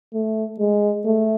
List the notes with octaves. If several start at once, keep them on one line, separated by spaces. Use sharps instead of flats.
A3
G#3
A3